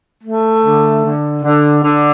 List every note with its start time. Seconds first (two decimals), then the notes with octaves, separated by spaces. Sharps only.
0.23 A3
0.63 D3
1.03 D3
1.43 D3
1.83 D3